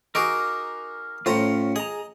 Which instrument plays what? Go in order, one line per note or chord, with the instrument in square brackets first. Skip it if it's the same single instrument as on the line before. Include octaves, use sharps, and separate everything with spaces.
[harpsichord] D#4 F#4 G#4 [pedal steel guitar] A#4 D6
[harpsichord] A2 C5 A#5 [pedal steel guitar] C#4 F4
[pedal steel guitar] G#4 A#5 [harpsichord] D#5